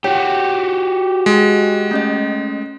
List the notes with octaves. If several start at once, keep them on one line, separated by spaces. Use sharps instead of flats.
F#4 G4 C#5 G5
G#3
A3 C#4 D#5